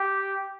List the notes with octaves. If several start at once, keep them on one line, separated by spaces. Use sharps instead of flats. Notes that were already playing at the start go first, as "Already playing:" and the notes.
Already playing: G4